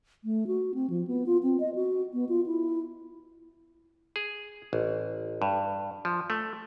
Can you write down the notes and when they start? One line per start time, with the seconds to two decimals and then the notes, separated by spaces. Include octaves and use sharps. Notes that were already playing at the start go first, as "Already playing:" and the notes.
0.24 A3
0.47 F#4
0.74 C4
0.90 F3
1.07 B3
1.26 F4
1.43 C4
1.60 D#5
1.75 F#4
2.14 B3
2.29 F4
2.46 E4
4.16 G#4
4.73 A1
5.42 G2
6.05 F3
6.30 A3